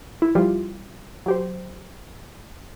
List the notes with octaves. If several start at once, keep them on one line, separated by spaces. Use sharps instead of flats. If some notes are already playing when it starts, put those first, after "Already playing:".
E4
F3 G3 E4 F4 G4
F#3 G4 C5